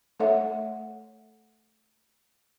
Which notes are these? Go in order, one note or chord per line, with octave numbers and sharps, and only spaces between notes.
A3 A4 C#5 E5 F#5